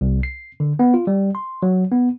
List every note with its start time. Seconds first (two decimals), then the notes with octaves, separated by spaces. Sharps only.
0.01 C2
0.23 C7
0.60 D3
0.79 B3
0.94 F4
1.07 G3
1.35 C6
1.63 F#3
1.91 B3